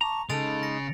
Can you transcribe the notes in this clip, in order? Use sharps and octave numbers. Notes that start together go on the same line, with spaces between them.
A5 A#5 C#6 D6 F7
C#3 G#3 D#4 A4 A6 D7 F7
A#6 C#7